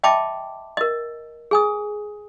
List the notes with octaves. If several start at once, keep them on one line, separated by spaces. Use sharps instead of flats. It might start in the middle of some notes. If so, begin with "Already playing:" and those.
D#5 E5 G5 A5 B5 D6
A#4 D#5
G#4 G#5 D#6